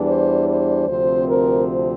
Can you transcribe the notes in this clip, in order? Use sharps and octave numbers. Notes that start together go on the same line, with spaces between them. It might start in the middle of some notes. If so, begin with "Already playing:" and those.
Already playing: E2 E3 G3 D4
C5
C5
D2 C3 F3 C4 C5
A#4